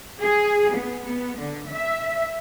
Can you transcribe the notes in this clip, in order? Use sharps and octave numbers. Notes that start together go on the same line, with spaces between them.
G#4
B3
B3
D3
E5